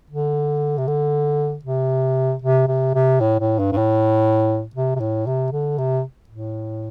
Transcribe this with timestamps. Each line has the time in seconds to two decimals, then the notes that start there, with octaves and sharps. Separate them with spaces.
0.10 D3
0.78 C3
0.87 D3
1.65 C3
2.42 C3
2.68 C3
2.95 C3
3.21 A2
3.40 A2
3.59 G2
3.72 G2
3.78 A2
4.76 C3
4.96 C3
5.00 A2
5.26 C3
5.52 D3
5.78 C3
6.29 A2